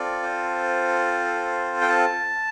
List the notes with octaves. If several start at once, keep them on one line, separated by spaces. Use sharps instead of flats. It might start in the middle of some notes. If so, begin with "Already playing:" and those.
Already playing: C4 F4 A4 D5
C5
G5
A5